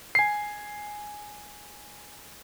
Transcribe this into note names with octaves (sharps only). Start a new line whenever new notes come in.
G#5 C7